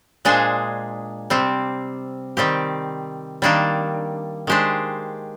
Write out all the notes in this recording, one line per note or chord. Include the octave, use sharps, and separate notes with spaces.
A#2 G#3 D4 G#4 C5
C3 G3 C4
D#3 G3 C4 G4
D#3 G3 A#3 D4
D#3 G#3 D4 G4 C5